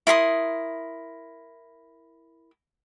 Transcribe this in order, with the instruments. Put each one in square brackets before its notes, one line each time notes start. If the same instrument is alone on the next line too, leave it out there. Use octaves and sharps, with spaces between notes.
[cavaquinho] E4 A#4 C6 D#6